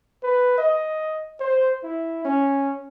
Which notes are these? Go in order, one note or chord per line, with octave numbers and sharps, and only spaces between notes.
B4
D#5
C5
E4
C#4